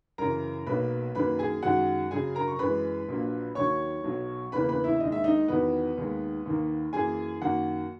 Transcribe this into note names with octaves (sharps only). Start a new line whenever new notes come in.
F#2 C#3 E3 A#4 A#5
B1 B2 F#3 A#3 B4 B5
F#2 D#3 F#3 A#3 B4 B5
G#4 G#5
F#2 D#3 G#3 F#4 F#5
F#2 C#3 F#3 G#4 G#5
A#4 A#5
C#6
F#2 E3 G#3 B4 B5
A#1 A#2 F#3 A#3
D#2 D#3 F#3 C#5 C#6
B1 B2 F#3
E2 C#3 E3 A#3 B4 B5
B4 B5
E4 E5
D#2 D#3 G#3 D#5
E5
D#4 D#5
E2 D#3 F#3 B3 B4
D#2 D#3 G#3
D#2 D#3 A#3
F#2 E3 A#3 G#4 G#5
F#2 D#3 A#3 F#4 F#5